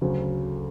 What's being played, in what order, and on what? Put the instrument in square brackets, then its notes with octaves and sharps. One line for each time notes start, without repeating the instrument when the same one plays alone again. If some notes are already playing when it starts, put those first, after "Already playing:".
[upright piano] D2 C#3 F#3